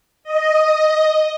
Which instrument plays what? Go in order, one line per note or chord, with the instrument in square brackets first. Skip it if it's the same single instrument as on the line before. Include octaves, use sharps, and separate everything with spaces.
[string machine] D#5